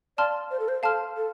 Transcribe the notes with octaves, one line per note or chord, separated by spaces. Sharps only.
D5 F5 A5 C6 F6
C5
A4
C5
A4 F5 A5 C6 F6
A4